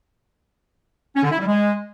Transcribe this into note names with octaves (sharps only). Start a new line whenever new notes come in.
C#4
D3
E4
G3
G#3